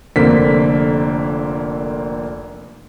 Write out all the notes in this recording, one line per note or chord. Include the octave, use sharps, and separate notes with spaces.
F1 F2 D3 A#3 C4 B6